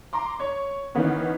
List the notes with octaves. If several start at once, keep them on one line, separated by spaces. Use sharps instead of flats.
A#5 C6 D6
C#5
D#3 E3 B3 C#4